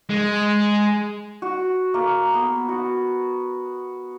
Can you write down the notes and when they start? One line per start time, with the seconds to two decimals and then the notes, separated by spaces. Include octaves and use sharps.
0.09 G#3
1.42 F#4
1.94 A#3
2.34 B3
2.69 F#4